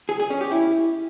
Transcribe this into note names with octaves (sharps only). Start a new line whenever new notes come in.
G#4
G#4
C#4
G4
E4